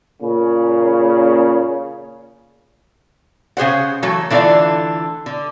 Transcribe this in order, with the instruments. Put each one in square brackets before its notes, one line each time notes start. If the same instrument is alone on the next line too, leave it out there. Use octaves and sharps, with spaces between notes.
[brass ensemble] A#2 C#3
[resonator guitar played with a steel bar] C#3 G#4 C5 F#5
E3 F#3 A3
D3 E3 A3 C#4 D4 F4
D3